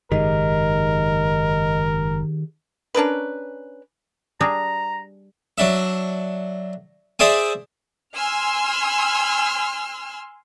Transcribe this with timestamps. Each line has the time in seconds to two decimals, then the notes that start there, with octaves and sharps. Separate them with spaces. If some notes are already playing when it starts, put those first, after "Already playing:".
0.12 F#1 G#2 D#3 G4 G#4 A#4 D#5
2.95 C#4 D4 A#4 B4
4.41 G3 D4 G#4 A#5
5.58 F#3 D4 E5
7.19 G#4 C5 D5 E5 G#5
8.16 G#5 C6 E6 F6